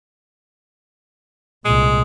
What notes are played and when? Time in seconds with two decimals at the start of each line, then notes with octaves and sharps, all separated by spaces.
1.65 C2 A#2 G#3